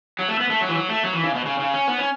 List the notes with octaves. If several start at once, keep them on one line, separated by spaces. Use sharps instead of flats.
F#3
A3
B3
A3
F#3
E3
F#3
A3
F#3
E3
C#3
B2
C#3
C#3
C#4
B3
C#4